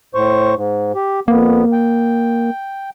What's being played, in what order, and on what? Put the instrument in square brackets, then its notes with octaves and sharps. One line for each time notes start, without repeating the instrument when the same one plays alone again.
[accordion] A2 C5 C#6
G#2
G4
[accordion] F2 B3 [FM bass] A#3
[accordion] G5